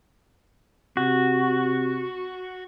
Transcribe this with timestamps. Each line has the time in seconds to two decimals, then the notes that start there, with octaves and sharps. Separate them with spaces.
0.97 C3 F#4